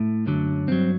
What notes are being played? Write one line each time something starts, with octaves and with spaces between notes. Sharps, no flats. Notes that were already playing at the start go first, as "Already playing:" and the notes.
Already playing: A2 A3
F#2 D3 F#3
G2 F#3 C4